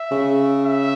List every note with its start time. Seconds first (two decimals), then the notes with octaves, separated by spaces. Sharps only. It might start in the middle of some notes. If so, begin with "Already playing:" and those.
Already playing: E5
0.11 C#3
0.64 E5